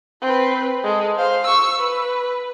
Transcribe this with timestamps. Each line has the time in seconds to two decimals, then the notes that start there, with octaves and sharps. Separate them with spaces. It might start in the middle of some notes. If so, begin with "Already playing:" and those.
0.22 C4 B4
0.83 G#3 A4
1.16 C5 F5
1.45 C#6 E6
1.79 B4